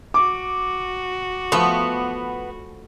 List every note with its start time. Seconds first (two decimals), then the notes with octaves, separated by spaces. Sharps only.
0.14 F#4 D6
1.52 F3 A3 B3